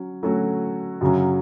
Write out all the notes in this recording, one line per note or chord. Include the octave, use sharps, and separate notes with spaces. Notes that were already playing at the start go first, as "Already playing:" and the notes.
Already playing: F#3 C#4
F#3 A3 C#4 F#4
F#2 C#3 F#3 C#4